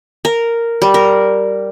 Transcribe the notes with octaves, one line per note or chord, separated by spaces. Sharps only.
A#4
G3
A#4